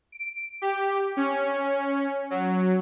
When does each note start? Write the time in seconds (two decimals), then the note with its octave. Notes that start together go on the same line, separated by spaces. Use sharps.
0.12 D7
0.62 G4
1.17 C#4
2.30 F#3